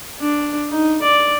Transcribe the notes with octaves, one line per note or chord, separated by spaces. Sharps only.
D4
D#4
D5